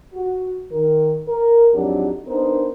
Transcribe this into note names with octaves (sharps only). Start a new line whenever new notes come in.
F#4
D#3 A#4
A#4
F2 G#2 F#3 D4 D#4 G4
B3 D4 D#4 A#4 C5